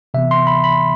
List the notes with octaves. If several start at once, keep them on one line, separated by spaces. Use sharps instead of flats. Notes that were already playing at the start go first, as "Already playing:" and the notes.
C3 E3 B3 E5
C6
B5
B5